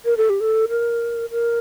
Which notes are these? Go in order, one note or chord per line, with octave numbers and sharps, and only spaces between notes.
A#4
A4
G4
A4
A#4
A#4